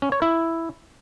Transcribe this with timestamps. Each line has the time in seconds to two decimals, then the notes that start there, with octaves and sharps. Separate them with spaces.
0.02 C#4
0.12 C#5
0.22 E4